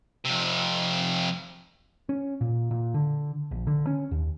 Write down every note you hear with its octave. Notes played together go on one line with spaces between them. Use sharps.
F2 C3
C#4
A#2
A#2
D3
A#1
D3
C#4
D#2